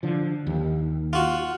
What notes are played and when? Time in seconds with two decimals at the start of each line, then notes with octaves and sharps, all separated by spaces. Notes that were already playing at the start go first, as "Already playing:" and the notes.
0.03 D3 F3
0.47 D#2
1.13 F4 F#4